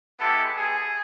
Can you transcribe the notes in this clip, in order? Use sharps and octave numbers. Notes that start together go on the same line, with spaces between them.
G#3 B3 E4 G4 A4
G#4